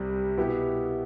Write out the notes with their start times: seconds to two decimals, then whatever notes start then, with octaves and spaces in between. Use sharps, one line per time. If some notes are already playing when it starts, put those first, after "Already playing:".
Already playing: C2 C3 G3
0.38 B2 B3 E4 G4